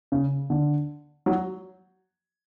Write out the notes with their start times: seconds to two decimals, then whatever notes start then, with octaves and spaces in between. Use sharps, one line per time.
0.12 C#3
0.50 D3
1.26 F#3